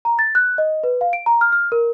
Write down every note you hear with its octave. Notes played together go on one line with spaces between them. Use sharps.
A#5
A6
F#6
D#5
B4
F5
D7
A#5
F6
F6
A#4